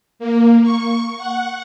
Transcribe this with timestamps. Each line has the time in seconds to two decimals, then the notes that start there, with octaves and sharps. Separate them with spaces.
0.19 A#3
0.63 C#6
1.18 F#5